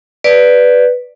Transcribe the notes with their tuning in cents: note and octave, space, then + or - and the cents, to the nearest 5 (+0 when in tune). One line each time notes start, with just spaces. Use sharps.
B4 +0 D5 +0